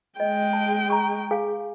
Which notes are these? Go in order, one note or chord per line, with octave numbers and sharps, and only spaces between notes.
G#3 D#5 G5
A5
A#5 C#6
G#4 F5 G#5